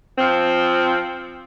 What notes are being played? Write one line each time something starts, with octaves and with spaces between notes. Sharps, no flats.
F3 C4